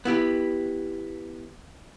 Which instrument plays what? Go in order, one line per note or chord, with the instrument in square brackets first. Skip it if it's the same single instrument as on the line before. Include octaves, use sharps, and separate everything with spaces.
[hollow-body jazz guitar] B3 E4 G4